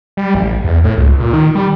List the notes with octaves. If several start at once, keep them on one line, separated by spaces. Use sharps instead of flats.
G3
A1
E2
A2
C#2
A#2
D#3
G3